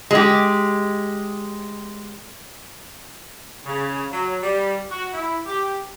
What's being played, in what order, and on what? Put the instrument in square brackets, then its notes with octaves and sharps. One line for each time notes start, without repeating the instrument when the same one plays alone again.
[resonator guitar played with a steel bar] G#3 G4
[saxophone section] C#3
F#3
G3
F#4
E4
G4